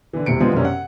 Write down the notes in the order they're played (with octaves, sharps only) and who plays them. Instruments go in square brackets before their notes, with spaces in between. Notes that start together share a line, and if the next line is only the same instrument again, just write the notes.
[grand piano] D3 E3
E1 A2 C3 C#7 D7
D3 F3 G#3 B3 C4
F#2 C3 A#3 C#4 D4
F#5